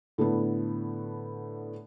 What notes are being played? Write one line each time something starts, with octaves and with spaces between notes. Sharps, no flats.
A2 D3 A3 B3